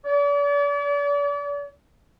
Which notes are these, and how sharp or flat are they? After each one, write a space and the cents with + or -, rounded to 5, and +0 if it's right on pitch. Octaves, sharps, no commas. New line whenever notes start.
D5 -40